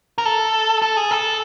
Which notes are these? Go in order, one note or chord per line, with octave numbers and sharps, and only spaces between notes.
A#4
A4
A4
G#4
A4